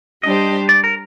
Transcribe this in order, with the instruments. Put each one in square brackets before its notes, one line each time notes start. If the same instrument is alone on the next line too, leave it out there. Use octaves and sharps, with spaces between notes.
[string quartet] G3 D4 G4 C5 [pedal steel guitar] D#5
[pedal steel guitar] D5
A#4